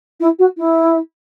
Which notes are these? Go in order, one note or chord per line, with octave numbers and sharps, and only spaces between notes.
E4
F#4
E4